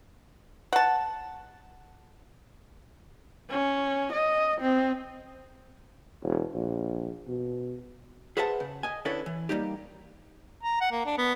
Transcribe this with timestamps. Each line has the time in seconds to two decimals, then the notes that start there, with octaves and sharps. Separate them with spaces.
0.73 F#5 A5
3.50 C#4
4.12 D#5
4.61 C4
6.23 E1
6.54 A#1
7.27 B2
8.37 G#4 B4 C5 E5 F#5 A5
8.60 C#3
8.83 D#5 G#5
9.05 D3 C#4 E4 A4 B4 C#5
9.26 E3
9.49 G3 A#3 D#4 G4
10.63 A#5
10.80 F#5
10.92 A#3
11.06 D4
11.18 B3